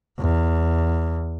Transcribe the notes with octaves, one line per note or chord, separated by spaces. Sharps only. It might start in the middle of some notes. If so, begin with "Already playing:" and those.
E2